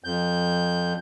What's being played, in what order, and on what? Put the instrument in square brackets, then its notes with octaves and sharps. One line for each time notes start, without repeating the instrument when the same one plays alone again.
[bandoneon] F2 G6